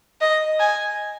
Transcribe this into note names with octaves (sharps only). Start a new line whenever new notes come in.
D#5
G#5